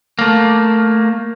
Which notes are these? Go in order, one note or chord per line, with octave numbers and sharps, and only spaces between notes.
A3 A#3